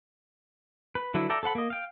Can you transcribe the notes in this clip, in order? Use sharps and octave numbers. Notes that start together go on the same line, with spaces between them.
B4
D3 F#3 D4 E4 B4
A4 D5 E5 G5 A#5
A4 C5 F#5 B5
A#3 D#5
F5 G5